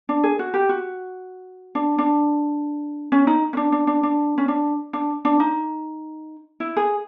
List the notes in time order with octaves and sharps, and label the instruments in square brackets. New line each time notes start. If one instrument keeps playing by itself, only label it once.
[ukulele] D4
G#4
F#4
G4
F#4
D4
D4
C#4
D#4
C#4
D4
D4
D4
D4
C#4
D4
D4
D4
D#4
E4
G#4